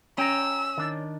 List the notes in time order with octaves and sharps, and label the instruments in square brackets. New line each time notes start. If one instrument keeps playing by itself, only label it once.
[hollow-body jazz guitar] C#4 [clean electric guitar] G5 A#5 [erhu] E6
[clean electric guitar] D#3 D4